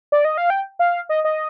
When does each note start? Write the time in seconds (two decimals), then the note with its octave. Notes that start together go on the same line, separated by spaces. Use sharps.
0.12 D5
0.25 D#5
0.38 F5
0.50 G5
0.79 F5
1.09 D#5
1.25 D#5